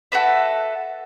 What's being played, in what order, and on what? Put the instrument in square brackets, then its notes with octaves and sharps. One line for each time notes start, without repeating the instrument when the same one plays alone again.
[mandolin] F#4 A4 B4 E5